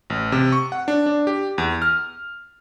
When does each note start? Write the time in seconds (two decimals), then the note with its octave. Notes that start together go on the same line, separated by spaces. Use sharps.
0.10 A1
0.32 C3
0.52 C#6
0.72 F#5
0.88 D4
1.06 D4
1.27 G4
1.58 E2
1.82 F6